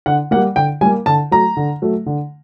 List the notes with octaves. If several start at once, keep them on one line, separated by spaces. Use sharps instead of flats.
D3 F#5
A#3 F#5
G3
D3 G5
G3 A#3 G#5
D3 A5
F#3 A3 A#5
D3
F#3 A3
D3